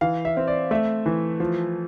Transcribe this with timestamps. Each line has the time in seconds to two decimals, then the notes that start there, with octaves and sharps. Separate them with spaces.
0.01 E3 F5
0.25 E5
0.37 C4
0.48 D5
0.71 A3 E5
1.06 E3
1.40 F3